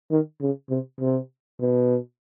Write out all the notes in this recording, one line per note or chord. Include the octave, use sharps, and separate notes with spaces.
D#3
C#3
C3
C3
B2